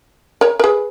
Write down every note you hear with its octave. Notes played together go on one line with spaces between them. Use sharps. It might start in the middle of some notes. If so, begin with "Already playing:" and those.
A#4 C#5
A#4
G#4 B4